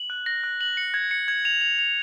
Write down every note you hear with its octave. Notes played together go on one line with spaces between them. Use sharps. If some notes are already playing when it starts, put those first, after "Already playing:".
Already playing: F#7
F#6
A#6
F#6
F#7
C#7
G#6
C#7
G#6
F7
F7
F7